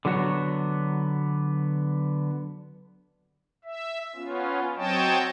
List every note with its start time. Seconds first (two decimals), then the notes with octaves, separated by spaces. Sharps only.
0.05 D3 F#3 B3 F#4 C#5
3.65 E5
4.15 B3 C#4 F4
4.76 F#3 C4 C#5 D#5 G5 A5